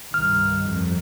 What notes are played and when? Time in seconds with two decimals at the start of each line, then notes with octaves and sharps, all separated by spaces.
0.14 C2 G2 D#3 F6
0.61 F2